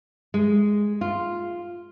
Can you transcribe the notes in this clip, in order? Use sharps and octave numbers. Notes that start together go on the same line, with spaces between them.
G#3
F4